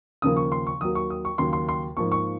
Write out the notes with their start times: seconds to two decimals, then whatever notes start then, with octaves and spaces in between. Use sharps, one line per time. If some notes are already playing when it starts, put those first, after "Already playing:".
0.22 D#2 C#3 F3 A#3 D#6
0.37 C#6
0.52 C6
0.67 C#6
0.81 D#2 D#3 F#3 A#3 D#6
0.95 C#6
1.10 D#6
1.25 C#6
1.38 D#2 C#3 F#3 A#3 C6
1.53 C6
1.69 C6
1.97 G#2 F3 A#3 C#6
2.12 C#6